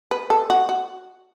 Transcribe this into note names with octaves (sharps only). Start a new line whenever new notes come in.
B4
A4
F#4
F#4